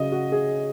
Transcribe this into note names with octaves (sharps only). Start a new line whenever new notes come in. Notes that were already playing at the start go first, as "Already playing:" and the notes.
Already playing: C#3 F#3 D#5
F#4
G#4